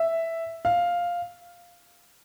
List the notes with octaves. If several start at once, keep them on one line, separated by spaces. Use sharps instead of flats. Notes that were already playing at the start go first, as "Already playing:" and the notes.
Already playing: E5
F5